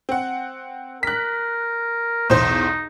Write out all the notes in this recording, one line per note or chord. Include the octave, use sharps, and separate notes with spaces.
C4 F#5
A#4 F#6 B6
B1 E2 D#4 C5